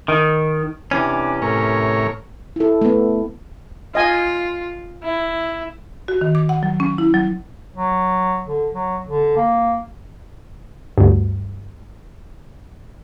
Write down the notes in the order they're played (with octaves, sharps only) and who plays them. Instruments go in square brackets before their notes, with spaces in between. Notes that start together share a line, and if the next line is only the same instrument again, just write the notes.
[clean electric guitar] D#3
[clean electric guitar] C3 E3 C#4 [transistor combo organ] D4
[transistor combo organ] A2 A#4 C#5
[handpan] E4 A4
A3 B3
[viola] F4 [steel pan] D#5 G#5
[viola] E4
[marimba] F#4
D#3
D6
F#5
F#3
C#4
E4
F#3
[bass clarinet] F#3
D3
F#3
D3
A#3
[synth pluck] D2 G2